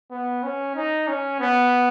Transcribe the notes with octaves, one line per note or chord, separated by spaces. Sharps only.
B3
C#4
D#4
C#4
B3